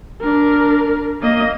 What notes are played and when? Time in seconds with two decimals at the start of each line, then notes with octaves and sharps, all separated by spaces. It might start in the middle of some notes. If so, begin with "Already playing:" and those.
0.21 D4 A#4
1.21 A#3 D#5